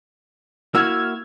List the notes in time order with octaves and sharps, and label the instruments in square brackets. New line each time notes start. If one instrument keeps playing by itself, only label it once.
[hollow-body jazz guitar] A#3 E4 F#4 [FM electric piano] E6 F6 G#6